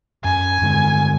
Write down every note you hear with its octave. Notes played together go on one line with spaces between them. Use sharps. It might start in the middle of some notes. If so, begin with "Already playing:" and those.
F#2 G#5
G2 D3 G#3